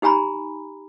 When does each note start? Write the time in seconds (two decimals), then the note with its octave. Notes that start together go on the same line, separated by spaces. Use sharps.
0.02 D#4 G4 G#5 A#5 B5